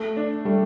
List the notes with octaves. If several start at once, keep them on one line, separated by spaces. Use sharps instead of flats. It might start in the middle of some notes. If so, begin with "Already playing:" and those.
Already playing: A3
D4
G3 A3